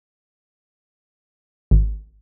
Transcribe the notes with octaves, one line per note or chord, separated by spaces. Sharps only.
G#1